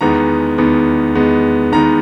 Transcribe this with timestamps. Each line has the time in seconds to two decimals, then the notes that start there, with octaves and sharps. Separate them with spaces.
0.01 E2 D#3 G#3 B3 A#5
0.58 E2 D#3 G#3 B3
1.15 E2 D#3 G#3 B3
1.72 E2 D#3 G#3 B3 A#5